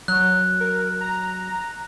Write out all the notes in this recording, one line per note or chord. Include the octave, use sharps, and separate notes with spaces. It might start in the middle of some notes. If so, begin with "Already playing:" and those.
F#3 F#6
A#4
A#5